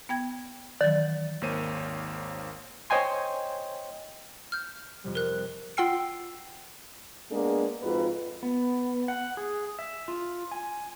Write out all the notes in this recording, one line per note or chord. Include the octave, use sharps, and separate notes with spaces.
B3 G5 G#6
D#3 E3 F#3 D5
G#1 D#2 A#3 C5 C#5 D#7
C5 C#5 D#5 G5 G#5 C6
F6 G6
F2 C3 G3
A#4 F#6
F4 F#5 G5 E6 C7
G#3 A#3 B3 D4 G#4
F2 G#2 F4 F#4 G#4 B4
B3
F#5
G#4
E5
F4
G#5